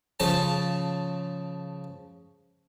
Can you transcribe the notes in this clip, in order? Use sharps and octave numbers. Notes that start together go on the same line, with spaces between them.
C#3 F3 A5